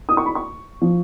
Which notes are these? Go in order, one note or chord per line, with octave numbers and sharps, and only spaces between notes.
D#6
C#6
B5
C#6
F3